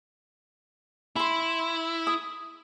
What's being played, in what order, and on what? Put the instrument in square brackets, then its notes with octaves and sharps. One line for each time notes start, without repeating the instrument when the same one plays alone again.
[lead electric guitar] E4 [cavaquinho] B5 C6
[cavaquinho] D#6